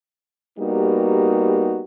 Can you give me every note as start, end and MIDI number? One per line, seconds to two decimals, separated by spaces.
0.59 1.82 55
0.59 1.82 58
0.59 1.82 59
0.59 1.82 63
0.59 1.82 66
0.59 1.82 67